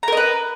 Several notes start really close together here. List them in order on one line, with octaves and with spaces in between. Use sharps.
A#5 A#4 D#5 B4